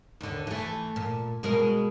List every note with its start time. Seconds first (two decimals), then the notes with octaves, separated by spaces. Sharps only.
0.21 D#2 D3
0.47 E3 A3
0.96 A#2
1.43 B2 G#3 A#4